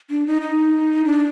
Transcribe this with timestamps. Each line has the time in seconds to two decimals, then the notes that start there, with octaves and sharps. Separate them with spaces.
0.10 D4
0.27 D#4
0.42 D#4
1.05 D4